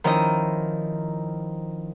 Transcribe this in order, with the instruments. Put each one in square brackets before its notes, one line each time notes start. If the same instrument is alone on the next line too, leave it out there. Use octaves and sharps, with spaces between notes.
[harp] D#3 F3 C#4 E4 D#5